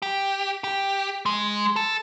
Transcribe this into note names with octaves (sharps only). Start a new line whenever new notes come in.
G4
G4
G#3
A4